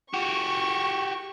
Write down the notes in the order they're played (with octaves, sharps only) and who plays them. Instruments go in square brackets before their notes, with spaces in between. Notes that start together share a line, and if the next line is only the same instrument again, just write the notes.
[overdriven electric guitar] F#4 G4 [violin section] C#6